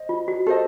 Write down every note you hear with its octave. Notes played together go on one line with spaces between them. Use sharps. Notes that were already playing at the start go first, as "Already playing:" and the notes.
Already playing: C5 D#5
F4
F#4
G4 A4 C5 D#5